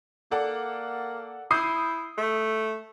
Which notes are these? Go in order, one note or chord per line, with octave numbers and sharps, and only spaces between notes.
A#3 A4 D5 F#5
E4 D#6 G6 C7
A3